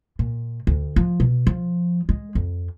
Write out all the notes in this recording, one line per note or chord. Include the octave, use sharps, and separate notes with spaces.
A#2
D2
F3
B2
F3
G#3
F2